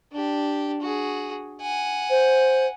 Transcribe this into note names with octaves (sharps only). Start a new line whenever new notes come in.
D4 G4
F#4 G#4
F#5 G#5
C5